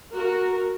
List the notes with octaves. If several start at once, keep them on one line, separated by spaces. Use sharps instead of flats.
F#4 A#4